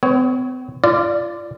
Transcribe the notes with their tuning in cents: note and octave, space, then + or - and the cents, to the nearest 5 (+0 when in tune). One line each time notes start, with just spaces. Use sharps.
C4 -45 C#5 +0
F4 -30 D5 +0